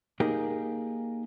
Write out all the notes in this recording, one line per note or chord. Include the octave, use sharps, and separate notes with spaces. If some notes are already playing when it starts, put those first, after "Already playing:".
A#3 D#4 G4 G#4 A#4 G5